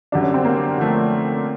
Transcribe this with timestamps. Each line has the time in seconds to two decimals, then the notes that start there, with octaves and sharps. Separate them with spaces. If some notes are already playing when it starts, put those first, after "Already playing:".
0.12 F#2 D3 G3 D4
0.23 C#4
0.34 C4
0.45 A#3
0.78 D3 F3 A3